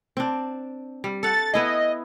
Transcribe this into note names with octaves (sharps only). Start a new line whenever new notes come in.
C4 D4
G3
A4 F#5 A6
B3 E4 G#4 D#5